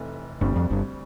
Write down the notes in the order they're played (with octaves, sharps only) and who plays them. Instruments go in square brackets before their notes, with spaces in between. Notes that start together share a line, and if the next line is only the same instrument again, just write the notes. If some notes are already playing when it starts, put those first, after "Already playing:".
Already playing: [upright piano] F1 F2 E3 A3
[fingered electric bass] G1 G2 [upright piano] D2 C3 G3 C4
[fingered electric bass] F2
G1 G2